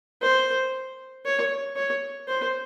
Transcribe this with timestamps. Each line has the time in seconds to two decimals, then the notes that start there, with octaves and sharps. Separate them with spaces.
0.22 C5
1.25 C#5
1.76 C#5
2.28 C5